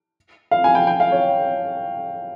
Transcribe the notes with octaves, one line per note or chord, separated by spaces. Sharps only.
F5
G#5
G5
G5
F5
C#5